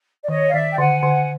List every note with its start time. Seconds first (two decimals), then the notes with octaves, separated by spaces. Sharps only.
0.24 D5
0.28 D#3 C#5 D#5
0.48 F5
0.53 D#3 D5 E5
0.71 G5
0.78 D3 F#5 G#5
1.03 D3